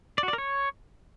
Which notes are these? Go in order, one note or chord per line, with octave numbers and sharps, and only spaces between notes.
D5
F#4
D5
A#4
C#5